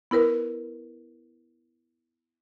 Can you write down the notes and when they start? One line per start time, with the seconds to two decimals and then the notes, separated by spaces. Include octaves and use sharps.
0.11 B3 E4 A#4 B4